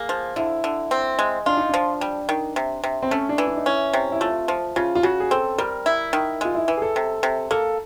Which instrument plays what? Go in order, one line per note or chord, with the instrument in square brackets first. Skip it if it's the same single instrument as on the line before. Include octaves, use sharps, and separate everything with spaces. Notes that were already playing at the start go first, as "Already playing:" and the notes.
Already playing: [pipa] A#3 [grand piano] G#4
[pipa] F3
[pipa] D3 [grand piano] E4
[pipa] D3
C4
G#3
[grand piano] D4 [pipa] F4
[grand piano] D#4
[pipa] F3 [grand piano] D4
[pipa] G3
D#3
C3
C3
[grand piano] C4
[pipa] A3 [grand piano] C#4
[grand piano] D4
[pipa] E3
[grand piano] D4
D#4
[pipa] C#4 [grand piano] E4
[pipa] C3
[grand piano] E4
[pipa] A3 [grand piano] F4
[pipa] F3
[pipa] C#3 [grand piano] F4
[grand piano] F4
[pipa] C#3 [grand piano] F#4
[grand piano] G#4
[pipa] C4 [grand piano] A4
[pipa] G3 [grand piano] A#4
[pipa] E4
D#3
[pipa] G#3 [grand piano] F4
[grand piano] E4
[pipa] E3
[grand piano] G#4
A4
[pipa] C3
C3
[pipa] A#3 [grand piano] A4